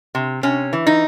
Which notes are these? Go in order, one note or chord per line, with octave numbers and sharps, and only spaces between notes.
C3
C3 C#4
E3
D#4